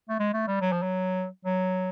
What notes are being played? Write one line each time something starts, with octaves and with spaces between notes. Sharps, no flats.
A3
G#3
A3
G3
F#3
F3
F#3
F#3